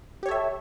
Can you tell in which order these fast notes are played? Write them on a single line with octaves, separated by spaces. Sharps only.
G4 C#5 A4 E5